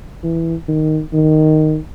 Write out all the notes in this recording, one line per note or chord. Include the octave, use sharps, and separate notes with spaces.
E3
D#3
D#3